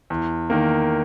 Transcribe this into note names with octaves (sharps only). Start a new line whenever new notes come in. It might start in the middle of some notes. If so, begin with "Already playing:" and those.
E2
D#3 A#3